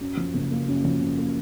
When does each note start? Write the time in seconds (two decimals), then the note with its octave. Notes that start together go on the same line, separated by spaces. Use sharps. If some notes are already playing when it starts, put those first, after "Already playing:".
0.01 F#2
0.17 F3
0.34 F#1
0.51 A#3
0.68 F#2
0.84 F3
1.01 F#1
1.18 A#3